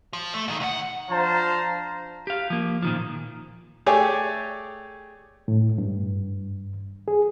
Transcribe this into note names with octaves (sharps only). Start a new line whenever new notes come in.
F3
A3
A#2 D#3
C2 F#5
F3 D4 C5 F5 A5 A#5
G4 F5
F3 A#3
A#2 D#3 F3
A3 G4 G#4 C#5 D5 G#5
A2
G2
G#4